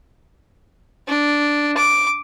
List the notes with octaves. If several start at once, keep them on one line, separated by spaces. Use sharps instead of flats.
D4
D6